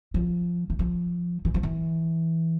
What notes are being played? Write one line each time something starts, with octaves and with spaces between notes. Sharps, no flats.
F3
E3
F3
E3
F3
E3